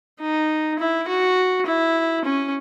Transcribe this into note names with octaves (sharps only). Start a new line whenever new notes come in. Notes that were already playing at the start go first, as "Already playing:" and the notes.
D#4
E4
F#4
E4
C#4